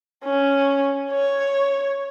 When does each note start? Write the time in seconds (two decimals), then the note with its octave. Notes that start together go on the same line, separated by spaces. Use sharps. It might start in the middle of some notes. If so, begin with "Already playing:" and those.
0.25 C#4
1.11 C#5